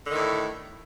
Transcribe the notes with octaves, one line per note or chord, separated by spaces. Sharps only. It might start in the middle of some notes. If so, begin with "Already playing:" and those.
A2 D3 D#3